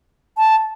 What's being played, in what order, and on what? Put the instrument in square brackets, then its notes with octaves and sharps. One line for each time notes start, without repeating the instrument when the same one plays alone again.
[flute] A5